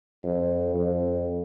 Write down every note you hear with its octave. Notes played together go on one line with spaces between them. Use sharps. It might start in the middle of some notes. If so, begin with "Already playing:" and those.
F2
F2